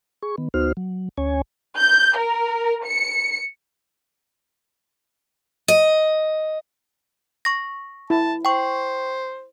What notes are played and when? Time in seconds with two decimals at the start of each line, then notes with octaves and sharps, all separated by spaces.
0.22 G#4 C#6
0.38 D#3 B3
0.54 D2 B3 D#4 F#4 C5 F6
0.77 F#3
1.17 D2 C#4 C#5 G#5
1.76 G6
2.16 A#4
2.84 C#7
5.68 D#5
7.45 C#6 A#6
8.10 E4 A5
8.45 C5 G5 C#6